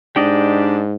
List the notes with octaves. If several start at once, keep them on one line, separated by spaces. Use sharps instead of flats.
G#2 D4 G4 D5 D#5